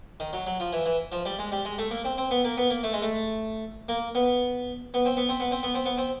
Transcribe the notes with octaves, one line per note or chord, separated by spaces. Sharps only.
D#3
F#3
F#3
F3
E3
E3
F3
G3
G#3
G3
G#3
A3
A#3
C4
C4
B3
A#3
B3
A#3
A3
G#3
A3
A#3
B3
B3
C4
B3
C4
B3
C4
B3
C4
B3
C4